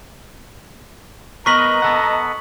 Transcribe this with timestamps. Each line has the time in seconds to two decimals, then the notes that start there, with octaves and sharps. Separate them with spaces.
1.46 B3 A#4 B4 D#5 A#5 C#6 B6 F#7
1.82 B3 A4 F#5